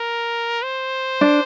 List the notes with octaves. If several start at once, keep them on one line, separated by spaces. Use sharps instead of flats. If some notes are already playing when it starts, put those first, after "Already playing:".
Already playing: A#4
C5
D4